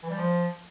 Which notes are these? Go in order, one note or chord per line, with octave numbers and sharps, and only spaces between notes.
E3
G3
F3